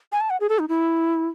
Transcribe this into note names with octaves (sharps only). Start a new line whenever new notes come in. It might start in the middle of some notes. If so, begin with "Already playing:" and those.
G#5
A5
F#5
G#4
A4
D#4
E4